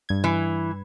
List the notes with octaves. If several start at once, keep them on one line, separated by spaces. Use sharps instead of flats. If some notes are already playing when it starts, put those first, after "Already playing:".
G2 G#6
E3